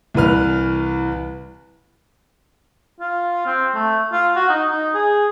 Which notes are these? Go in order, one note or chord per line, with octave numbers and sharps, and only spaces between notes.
C2 E3 B4 F6
F4
C4
A3
F4
F#4
D#4
D#4
G#4